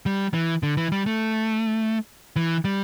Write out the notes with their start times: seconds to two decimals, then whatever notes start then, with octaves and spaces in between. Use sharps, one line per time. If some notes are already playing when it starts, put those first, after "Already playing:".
0.06 G3
0.34 E3
0.63 D3
0.77 E3
0.92 G3
1.06 A3
2.36 E3
2.65 G3